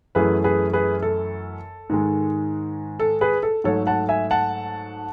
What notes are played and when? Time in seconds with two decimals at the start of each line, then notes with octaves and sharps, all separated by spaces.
0.15 F#2 E3 A3 G#4 B4
0.44 G#4 B4
0.73 G#4 B4
1.02 A4
1.90 G#2 D#3 G#3
3.00 A4
3.21 G#4 B4
3.43 A4
3.64 G#2 F#3 A3 A4 C#5
3.87 F#5 A5
4.09 E5 G#5
4.31 F#5 A5